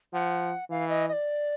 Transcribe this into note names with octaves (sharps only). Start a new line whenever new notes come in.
F3 F#5
E3 F5
D#5
D#5
D5